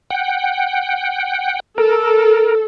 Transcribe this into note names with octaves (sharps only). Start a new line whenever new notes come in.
F#5 G5
A4 A#4